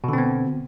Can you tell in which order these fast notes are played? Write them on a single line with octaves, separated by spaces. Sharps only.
B2 D3 C4 B3